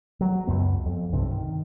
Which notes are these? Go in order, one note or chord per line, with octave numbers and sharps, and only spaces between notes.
F#3
C#2 F#2 B3
F2
B1 G2 C3
D#3